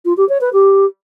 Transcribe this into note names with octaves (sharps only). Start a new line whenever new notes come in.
F4
G4
C#5
B4
G4